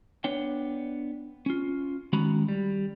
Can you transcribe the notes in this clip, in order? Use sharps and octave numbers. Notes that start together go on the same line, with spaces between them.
B3 D4 C#5 G5
C#4 F4
D#3 G#3 C#4 F#4 A#5 B5
G3